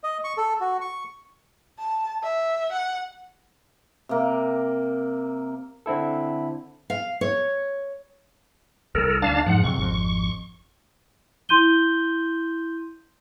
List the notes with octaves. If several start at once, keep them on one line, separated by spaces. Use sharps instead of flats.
D#5
C#6
A4
F#4
C#6
A5
E5
F#5
C3 A#3
D3 C4 E4 A4
F5
C#5
C2 G3 A4 A#4
D2 D4 F5 A5
F2 G#2 F3 F#5
C#2 F#2 C3 C#6
G#1 F2
E4 C6 G6 D#7 G7